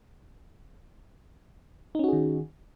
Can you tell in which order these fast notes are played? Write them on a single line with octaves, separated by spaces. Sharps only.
D#4 C#4 F#4 G#4 D#3